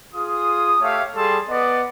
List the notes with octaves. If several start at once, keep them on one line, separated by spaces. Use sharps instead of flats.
F4 G#4 D#6
A3 G4 C#5 E5 F5
G3 G#4 A4 A5 C6
B3 D5 D#5